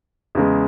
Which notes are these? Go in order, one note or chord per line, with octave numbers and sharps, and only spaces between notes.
E2 C#3 G#3